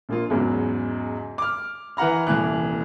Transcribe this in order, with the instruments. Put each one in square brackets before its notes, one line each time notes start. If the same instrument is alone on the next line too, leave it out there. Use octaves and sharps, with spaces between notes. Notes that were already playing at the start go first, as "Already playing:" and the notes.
[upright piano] A#1 A#3 F4
E2 G#2 C#3 F#3
D6 F6
E3 B4 F#5 A#5 F6
D#1 C2 A#2 E3 F#6